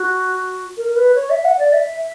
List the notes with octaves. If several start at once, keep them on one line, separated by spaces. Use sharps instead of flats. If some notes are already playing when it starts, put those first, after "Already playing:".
Already playing: F#4
A#4
A#4
B4
C#5
E5
F#5
D5
E5